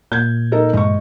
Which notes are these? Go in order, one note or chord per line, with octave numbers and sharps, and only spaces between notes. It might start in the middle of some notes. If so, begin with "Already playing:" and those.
A#2 G6 G#6
D#4 A4 A#4
G2 E3 G#3 D#5 C#6